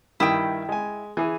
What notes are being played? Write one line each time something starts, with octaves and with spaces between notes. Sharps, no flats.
G2 D#3 E4 G5 D#6
G#3 G#5
E3 G#4